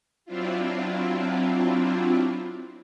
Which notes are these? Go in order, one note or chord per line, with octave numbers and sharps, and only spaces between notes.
F#3 C4 D4 E4 F4